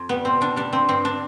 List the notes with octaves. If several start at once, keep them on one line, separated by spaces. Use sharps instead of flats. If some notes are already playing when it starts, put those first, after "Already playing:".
Already playing: F2
G3 B3
B2 C4
B2 D4
G3 D4
F3 C4
G2 C4
D4